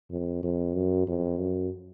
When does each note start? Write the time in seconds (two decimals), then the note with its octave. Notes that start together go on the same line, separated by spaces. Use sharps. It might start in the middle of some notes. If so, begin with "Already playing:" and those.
0.11 F2
0.43 F2
0.75 F#2
1.08 F2
1.40 F#2